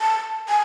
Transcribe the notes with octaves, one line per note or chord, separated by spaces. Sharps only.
A5
G#5